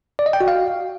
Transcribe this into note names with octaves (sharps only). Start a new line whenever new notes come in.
D5
D#5
G5
F#4
F5